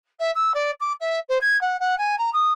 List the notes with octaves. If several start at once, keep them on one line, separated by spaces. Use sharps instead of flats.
E5
E6
D5
D6
E5
C5
G#6
F#5
F#5
G#5
A#5
D#6